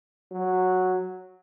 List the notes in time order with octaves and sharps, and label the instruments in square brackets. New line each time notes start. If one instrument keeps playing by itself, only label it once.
[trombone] F#3